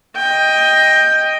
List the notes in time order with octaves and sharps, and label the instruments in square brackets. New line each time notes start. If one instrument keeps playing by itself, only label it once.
[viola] D#5 G5